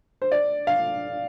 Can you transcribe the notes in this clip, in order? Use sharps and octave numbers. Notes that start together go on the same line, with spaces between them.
C5
D5
F5